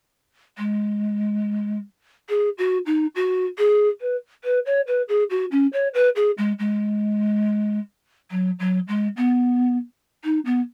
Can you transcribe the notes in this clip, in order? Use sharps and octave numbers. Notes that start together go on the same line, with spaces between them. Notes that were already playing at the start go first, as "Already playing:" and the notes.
G#3
G#4
F#4
D#4
F#4
G#4
B4
B4
C#5
B4
G#4
F#4
C#4
C#5
B4
G#4
G#3
G#3
F#3
F#3
G#3
B3
D#4
B3